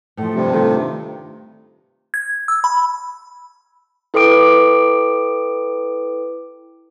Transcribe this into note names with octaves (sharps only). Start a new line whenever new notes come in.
A2 F3
G2 C3
D#3 A3 F4
G#6
E6
B5
E4 A4 B4 G5 D6 D7